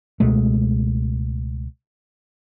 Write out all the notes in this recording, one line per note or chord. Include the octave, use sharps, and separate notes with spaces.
C#2 B2 G#3 A3